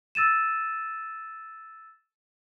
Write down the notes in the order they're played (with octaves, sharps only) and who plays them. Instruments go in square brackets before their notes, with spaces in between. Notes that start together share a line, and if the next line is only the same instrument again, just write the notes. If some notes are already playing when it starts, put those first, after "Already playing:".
[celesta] E6 A6 D#7 E7